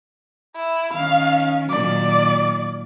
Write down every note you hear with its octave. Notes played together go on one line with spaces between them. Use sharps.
E4
D#3 C#4 F5
A#2 D#3 F#3 D5